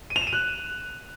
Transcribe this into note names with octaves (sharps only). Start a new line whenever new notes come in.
D#7
F7
E7
D#7
F#6